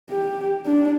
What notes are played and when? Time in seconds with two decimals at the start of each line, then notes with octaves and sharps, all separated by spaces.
0.10 G4
0.66 D4